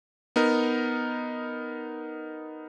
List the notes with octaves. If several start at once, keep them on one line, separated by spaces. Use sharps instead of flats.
B3 D#4 A#4